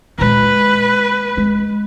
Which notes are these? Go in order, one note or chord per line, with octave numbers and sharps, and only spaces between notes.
A#2 G#3 B4
G#3